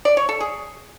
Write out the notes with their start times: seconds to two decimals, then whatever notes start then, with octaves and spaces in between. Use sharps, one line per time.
0.05 D5
0.17 C#5
0.29 A4
0.40 G#4